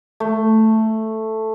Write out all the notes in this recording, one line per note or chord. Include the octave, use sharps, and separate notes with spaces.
A3